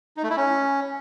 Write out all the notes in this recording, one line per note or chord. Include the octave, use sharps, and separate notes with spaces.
D#4
A3
E4
C#4